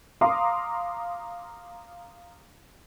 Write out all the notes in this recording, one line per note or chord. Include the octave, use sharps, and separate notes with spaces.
F5 A#5 C6 D6 D#6